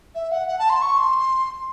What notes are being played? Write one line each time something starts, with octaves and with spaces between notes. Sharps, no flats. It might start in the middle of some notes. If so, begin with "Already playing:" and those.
E5
F#5
F#5
A5
C6
C#6
C6